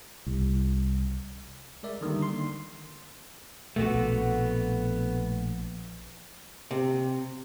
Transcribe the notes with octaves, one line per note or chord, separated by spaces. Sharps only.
C2
G#3 A#4 D5 E5
D3 D#3 G3 A#3
C6
A#1 B2 A3 B3 F#4
C3